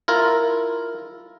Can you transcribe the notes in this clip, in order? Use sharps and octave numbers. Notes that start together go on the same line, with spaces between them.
E4 F4 A#4